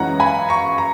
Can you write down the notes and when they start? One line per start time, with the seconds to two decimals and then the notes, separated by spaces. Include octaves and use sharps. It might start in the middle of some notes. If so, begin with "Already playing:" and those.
Already playing: F#2 E3 G#3 C#4 F#5 A#5
0.20 G#5 B5
0.49 A#5 C#6
0.78 A#5